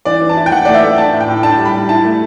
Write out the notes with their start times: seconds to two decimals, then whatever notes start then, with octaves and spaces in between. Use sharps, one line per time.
0.05 E3 D5
0.21 E3
0.29 A5
0.37 E4
0.46 G5
0.52 E3 F#5
0.65 A3 D5
0.74 E5
0.82 A3
0.98 D4 A5
1.13 A2
1.20 G5
1.28 A2
1.43 D4 A5
1.58 G3
1.65 B5
1.73 G3
1.89 E4 A5
2.04 A3